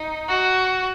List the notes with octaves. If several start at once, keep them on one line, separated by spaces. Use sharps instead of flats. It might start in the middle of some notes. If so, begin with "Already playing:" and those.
Already playing: D#4
F#4